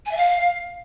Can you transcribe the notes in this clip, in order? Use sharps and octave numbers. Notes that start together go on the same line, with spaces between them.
G#5
E5
F5